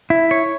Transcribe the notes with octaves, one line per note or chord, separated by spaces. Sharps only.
E4
C#5